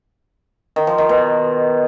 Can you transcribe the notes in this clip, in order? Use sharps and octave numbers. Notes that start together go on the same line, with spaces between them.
D#3
F3
D#3
B2